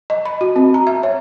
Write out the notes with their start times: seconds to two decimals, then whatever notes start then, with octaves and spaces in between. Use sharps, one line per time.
0.10 D#5
0.26 B5
0.41 F#4
0.56 C4
0.74 A#5
0.87 E5
1.03 C#5